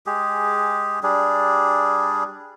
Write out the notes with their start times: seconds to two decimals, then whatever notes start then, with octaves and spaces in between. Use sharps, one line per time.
0.06 G#3 G4 G#4
1.03 G3 D4 G#4